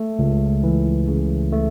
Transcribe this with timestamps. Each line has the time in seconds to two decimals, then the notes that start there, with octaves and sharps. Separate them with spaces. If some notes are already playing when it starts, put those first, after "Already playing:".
Already playing: A3
0.19 C#2
0.64 E3
1.08 C#3
1.53 A3